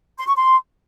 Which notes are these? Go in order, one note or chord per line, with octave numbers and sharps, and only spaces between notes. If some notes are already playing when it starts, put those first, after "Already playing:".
C6
C#6
C6